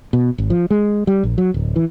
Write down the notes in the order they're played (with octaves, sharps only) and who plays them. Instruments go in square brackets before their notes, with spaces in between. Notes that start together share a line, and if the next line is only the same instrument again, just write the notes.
[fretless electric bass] B2
G#1
F3
G#3
G3
A#1
F#3
D1
E3